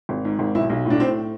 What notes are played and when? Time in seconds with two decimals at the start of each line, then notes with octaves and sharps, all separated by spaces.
0.09 G#1
0.25 G#2
0.39 G#1
0.55 B1 E4
0.70 B1
0.85 A2 D4
1.00 A2 C4